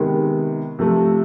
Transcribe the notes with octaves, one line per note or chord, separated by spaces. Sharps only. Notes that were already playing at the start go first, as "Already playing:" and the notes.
Already playing: C3 D#3 G#3 B3
C3 F3 A3